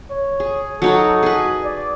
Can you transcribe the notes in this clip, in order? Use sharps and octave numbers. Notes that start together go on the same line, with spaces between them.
C#5
G#4
F#3 D#4 F#4 A4
G#4 B4
D5